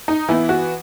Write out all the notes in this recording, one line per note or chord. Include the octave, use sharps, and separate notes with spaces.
D#4
E3 B3 E4
F#4